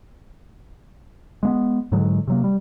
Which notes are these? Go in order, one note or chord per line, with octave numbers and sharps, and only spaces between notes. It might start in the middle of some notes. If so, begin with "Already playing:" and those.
G#3 A#3 B3
G#2 D3 F#3 G#3
C3 F#3 A#3
G3